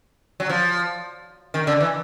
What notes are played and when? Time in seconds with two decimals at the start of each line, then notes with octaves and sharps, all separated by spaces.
0.40 F#3
0.49 F3
1.54 D#3
1.67 D3
1.80 E3